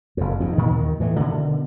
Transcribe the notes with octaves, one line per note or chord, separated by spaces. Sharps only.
F#1 F2
F2 G#2
A#2 D#3 E3 G#3
D#2 D#3
A2 E3 F#3 A3
B2 D3 D#3